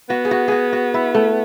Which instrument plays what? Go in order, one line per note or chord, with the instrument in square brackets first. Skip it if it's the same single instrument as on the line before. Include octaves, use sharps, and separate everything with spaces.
[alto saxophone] B3 [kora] F#4
[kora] G#4
F#4
F#4 G#4
F#4
E4
A3